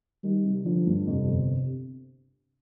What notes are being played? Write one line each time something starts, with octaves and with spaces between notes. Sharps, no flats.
D#3 G3
C3
D3 F3
G2
F2 C3
G1